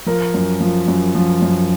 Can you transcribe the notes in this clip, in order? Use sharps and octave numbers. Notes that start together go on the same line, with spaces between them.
F3 A#4
F#2
F3
F#2
F3
F#2